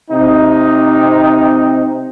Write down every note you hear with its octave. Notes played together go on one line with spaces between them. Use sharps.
C3 C4 D#4